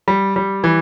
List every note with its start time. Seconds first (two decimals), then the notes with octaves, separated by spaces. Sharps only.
0.08 G3
0.36 G3
0.64 E3